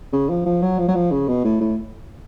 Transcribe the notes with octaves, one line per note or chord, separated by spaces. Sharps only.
C#3
F3
F3
F#3
F3
F#3
F3
C#3
B2
A2
A2